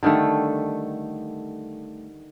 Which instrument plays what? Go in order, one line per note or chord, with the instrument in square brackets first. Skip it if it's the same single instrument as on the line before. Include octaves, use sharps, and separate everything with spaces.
[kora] D3 D#3 G3 A3